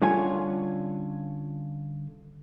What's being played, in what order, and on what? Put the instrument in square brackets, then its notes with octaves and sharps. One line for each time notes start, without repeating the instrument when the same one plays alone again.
[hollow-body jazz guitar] D3 G3 C#4 F4 C#5 G#5